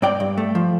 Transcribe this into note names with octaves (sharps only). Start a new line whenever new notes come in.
G2 D5 G5
G2
A3
F3